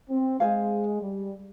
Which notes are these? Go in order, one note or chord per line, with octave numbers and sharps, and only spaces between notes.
C4
G#3 G#4 C5 F5 G#5
G3